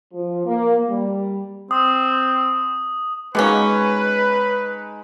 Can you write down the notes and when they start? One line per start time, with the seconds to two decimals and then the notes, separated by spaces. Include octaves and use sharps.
0.13 F3
0.45 A#3
0.89 G3
1.71 C4 D#6
3.35 B2 G#3 A#3 C#4 D#4 B4